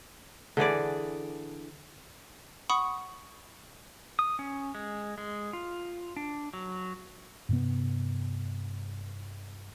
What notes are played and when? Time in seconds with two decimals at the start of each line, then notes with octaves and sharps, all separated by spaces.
0.57 D3 E3 G#4 D5
2.70 F#5 B5 C#6 D#6
4.19 D#6
4.39 C#4
4.75 G#3
5.18 G#3
5.53 F4
6.16 D4
6.53 F#3
7.49 G2 C3 B3